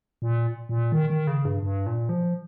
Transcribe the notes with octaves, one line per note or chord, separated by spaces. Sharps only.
A#2
A#2
D#3
D#3
C#3
G2
G2
A#2
F3